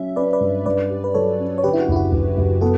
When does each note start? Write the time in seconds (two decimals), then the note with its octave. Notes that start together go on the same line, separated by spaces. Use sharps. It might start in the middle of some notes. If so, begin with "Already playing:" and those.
Already playing: F#3 C#4 E5
0.16 C#4 B4 D5
0.33 B4 D5
0.40 G2
0.66 G2 B4 D5
0.90 G4
1.04 B4
1.14 F#3 A4 C#5
1.39 C#4
1.58 C#5
1.64 D3 G4 B4
1.73 E4
1.80 F#4
1.88 F#1 E4
1.96 F#4
2.12 F#1
2.37 F#1
2.61 B3 F#4 A4